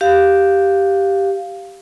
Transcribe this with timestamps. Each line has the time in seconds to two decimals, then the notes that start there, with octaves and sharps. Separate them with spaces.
0.01 G4 F5